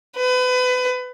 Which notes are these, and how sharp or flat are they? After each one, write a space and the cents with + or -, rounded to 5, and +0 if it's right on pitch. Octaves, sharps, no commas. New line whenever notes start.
B4 +30